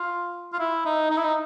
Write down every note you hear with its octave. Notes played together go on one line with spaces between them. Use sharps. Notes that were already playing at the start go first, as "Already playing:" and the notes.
Already playing: F4
F4
E4
D#4
D#4
E4
D#4